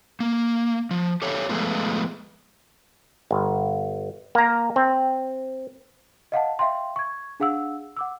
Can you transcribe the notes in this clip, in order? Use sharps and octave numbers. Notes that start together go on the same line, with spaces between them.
A#3
F3
G4 A4 C#5 E5 F5
F3 G#3 A3 B3 F4
G1
A#3 A#5
C4
D#5 F5 F#5 A5
E5 F5 G5 C6
C#6 G#6
D4 G#4 F5 F#5 E6
F#5 D6 E6